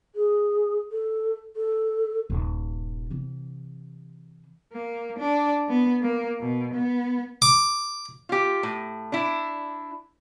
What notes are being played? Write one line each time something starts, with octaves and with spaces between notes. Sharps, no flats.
G#4
A4
A4
D#1 G2
C3 E3
A#3
D4
B3
A#3
B2
B3
D6
F4 G4
A2
D4 E4